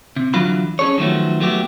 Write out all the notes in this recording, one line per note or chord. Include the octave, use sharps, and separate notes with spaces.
C3
D3 E3 F#3 F4 B5
C#4 G#4 A4 C#5
D#3 F3 F#3 A3 B3
F#3 A3 B3 G4